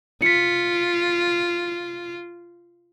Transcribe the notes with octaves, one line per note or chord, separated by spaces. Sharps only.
F4 B6 C#7